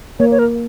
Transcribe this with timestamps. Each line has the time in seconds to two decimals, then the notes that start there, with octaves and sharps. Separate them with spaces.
0.19 A#3 C#5
0.31 C#5
0.39 A#4